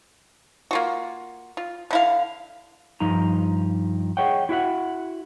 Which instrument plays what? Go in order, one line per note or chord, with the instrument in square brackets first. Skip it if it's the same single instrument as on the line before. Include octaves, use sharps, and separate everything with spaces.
[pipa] A#3 F4 F#4
F4
D3 E4 F5
[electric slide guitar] G2 F3 D#4 A#5
G#4 C#5 D#5 F#5 G5
E4 F#4 E5 F#5